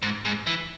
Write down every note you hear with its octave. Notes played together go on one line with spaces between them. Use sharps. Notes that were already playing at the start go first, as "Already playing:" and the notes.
G#2
G#2
E3